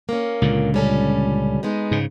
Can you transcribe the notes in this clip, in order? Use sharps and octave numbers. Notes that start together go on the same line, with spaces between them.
A#3 C#4
C#2 A#2 D3
G3 C#4 A4
G#3 B3 D#4
G#2 C#3